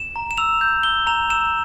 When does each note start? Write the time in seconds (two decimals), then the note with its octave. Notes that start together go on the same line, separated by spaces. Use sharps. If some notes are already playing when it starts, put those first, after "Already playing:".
Already playing: E7
0.16 A#5
0.31 E7
0.37 E6 F7
0.61 G6
0.83 E6 G7
1.07 A#5 F7
1.30 E6 E7